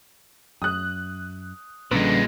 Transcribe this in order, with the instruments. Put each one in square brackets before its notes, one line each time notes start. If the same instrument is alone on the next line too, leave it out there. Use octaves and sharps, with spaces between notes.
[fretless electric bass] F#2 [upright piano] D#6 F#6
[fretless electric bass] A#1 D3 [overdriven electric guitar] A#2 G#3 [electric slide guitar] G3 C#4 B4